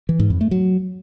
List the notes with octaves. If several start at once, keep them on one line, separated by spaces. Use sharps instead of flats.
E3
G#2
F2
A3
F#3